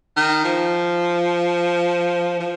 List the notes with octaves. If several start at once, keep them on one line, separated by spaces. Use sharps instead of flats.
D#3
F3
F3